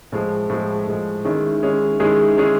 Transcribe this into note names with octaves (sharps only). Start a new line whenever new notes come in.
A2 F3 G#3
A2 F3 G#3
A2 F3 G#3
D#3 G#3 C#4 E4 G#4
D#3 G#3 C#4 E4 G#4
D#3 G#3 C#4 E4 G#4
D#3 G#3 C#4 E4 G#4